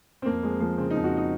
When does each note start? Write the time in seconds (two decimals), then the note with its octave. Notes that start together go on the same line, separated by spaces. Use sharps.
0.22 C4
0.25 F2 A#3
0.43 F2 G#3
0.60 F3 A#3
0.77 C#3 C4
0.90 F2 D#4
1.04 F#4
1.17 D#4